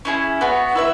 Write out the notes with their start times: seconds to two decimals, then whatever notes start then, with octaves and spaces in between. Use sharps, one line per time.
0.05 C#4 E4 G#4
0.41 B3 F#4 C#5
0.75 E4 B4 E5